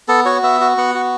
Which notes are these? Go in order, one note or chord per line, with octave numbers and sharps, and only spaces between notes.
B3 A4
F#4 C#5
B3 E5
F#4
B3 F#5
F#4